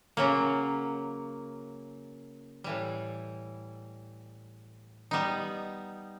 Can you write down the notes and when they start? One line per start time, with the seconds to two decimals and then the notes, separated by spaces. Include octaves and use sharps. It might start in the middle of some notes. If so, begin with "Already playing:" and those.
0.17 C#3 F#3 A#3
2.64 A2 E3 G3
5.11 G3 B3 D#4